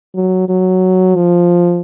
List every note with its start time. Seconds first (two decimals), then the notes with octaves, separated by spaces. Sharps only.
0.15 F#3
0.49 F#3
1.16 F3